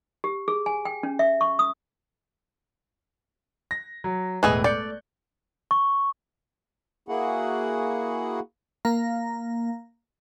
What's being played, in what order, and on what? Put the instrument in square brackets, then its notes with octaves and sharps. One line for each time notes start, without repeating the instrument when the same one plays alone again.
[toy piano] G4
G#4
G#5
G5
C#4
E5
C#6
D#6
[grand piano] A#6
F#3
[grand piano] E1 A2 F#6 [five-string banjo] E3 G#4 D#5
[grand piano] A3 G6 C#7 [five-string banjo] D5
[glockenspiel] C#6
[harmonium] A#3 E4 F#4 G#4 F#5
[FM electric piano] A#3 F5 A#5